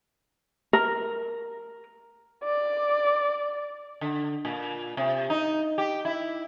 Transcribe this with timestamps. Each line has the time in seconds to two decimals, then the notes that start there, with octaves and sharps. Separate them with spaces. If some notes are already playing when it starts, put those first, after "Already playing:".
0.73 A#4
2.44 D5
4.01 D3
4.45 A#2
4.97 C3
5.30 D#4
5.78 G4
6.05 E4